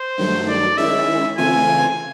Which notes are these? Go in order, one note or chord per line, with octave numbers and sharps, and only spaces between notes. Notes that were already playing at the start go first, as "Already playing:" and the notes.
Already playing: C5
G2 D#3 F#3 A3
D5
D#3 G#3 C#4 E4 E5
C#3 E3 A3 C4 F4 G#5